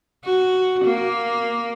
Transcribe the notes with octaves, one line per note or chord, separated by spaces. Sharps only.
F#4
A#3